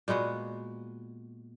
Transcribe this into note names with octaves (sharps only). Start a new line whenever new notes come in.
A#2 G#3 B3 F#4